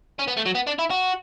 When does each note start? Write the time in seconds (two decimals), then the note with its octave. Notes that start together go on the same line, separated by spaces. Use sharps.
0.19 C#4
0.28 B3
0.37 A3
0.46 F#3
0.55 B3
0.67 D4
0.79 E4
0.90 F#4